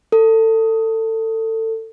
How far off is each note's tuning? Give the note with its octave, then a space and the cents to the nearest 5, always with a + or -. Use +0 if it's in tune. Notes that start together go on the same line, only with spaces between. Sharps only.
A4 +25